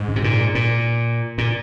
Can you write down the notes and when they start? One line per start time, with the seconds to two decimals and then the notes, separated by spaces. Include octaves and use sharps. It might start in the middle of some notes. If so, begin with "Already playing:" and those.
Already playing: G#2
0.08 C#3
0.16 C3
0.24 A#2
0.55 A#2
1.38 A#2